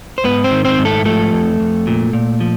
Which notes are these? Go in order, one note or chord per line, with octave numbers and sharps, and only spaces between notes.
C5
G#2 B3 B4
C4 C5
D#3
C4 C5
G#2
A3 A4
F3 A3 A4
F2
F2
A#2
A#2
F3